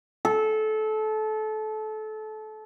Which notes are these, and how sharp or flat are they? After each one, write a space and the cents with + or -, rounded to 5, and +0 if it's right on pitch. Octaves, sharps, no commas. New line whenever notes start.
A4 -25